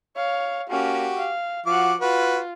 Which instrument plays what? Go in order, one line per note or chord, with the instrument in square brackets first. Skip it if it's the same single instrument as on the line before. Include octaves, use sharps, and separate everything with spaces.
[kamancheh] C#5 F5
[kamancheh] A#3 C#4 [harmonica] F#4 G4
[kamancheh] F5
[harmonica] F3 F#4 D6 [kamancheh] F5 F#5
[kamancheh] F4 [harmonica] F#4 B4